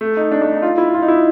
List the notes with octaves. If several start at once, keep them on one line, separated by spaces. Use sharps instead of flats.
A3
D#4
D4
D4
D#4
F4
E4
F4
D#4
E4